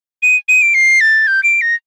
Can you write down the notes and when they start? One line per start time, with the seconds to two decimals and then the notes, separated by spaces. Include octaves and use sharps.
0.22 D#7
0.48 D#7
0.62 D7
0.74 C7
1.01 A6
1.27 G6
1.43 D7
1.61 A#6